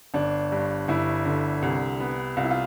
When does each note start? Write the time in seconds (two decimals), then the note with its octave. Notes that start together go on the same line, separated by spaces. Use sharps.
0.14 G1 D4
0.52 G2
0.88 G1 E4
1.25 D3
1.62 C2
2.00 B3
2.37 C2 F4
2.44 E4
2.51 F4